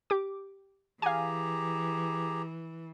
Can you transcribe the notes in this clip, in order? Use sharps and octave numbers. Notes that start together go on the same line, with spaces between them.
G4 D6
E3 G4 G#4 F5 G#5 A#5